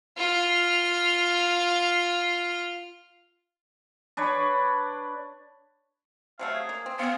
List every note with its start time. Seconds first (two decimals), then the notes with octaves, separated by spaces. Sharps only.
0.17 F4 F6
4.17 D4 B4 C#5
6.39 C3 F#3 A3 F5
6.55 G#4
6.69 A#3
6.86 C4
6.99 B3 C4 G#4 F5